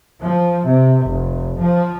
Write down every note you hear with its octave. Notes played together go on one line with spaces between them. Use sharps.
F3
C3
F1
F3